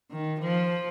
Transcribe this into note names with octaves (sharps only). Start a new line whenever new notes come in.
D#3
F3